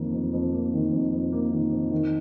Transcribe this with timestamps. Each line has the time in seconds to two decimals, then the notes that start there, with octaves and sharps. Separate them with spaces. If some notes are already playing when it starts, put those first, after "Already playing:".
Already playing: F2 D#3 A#3
0.14 F2
0.33 F2
0.53 A#3
0.73 D#3
0.92 F2
1.13 F2
1.32 A#3
1.52 D#3
1.72 F2
1.91 D#3